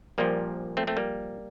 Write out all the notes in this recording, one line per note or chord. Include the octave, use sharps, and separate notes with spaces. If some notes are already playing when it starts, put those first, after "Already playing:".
A#1 A#2 F3 G3 A#3
A3 C4
A3 C4
G3 A#3